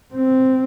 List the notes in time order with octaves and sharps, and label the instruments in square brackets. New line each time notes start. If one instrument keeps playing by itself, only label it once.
[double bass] C4